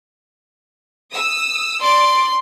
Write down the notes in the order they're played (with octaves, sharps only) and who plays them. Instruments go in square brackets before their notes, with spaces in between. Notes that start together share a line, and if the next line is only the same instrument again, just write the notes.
[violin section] D#6 E6
[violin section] D5 D6 [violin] C6